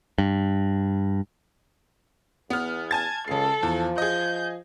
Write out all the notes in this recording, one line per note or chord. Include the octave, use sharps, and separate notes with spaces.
G2
E2 B3 F6
G#5 A5 G#6 A6
C#2 C#3 A4 C7
E2 F3
G#4 D#5 G6